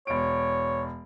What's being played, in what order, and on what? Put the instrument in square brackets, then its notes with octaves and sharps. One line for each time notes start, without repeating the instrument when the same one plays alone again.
[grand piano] E1 D7 [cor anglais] C#5